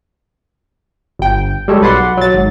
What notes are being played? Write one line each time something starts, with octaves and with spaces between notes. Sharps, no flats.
G1 G5
G3 G#3 A4 C#5
B1 B4 D5 F#5 C6
F#3 A6
G#1 G#2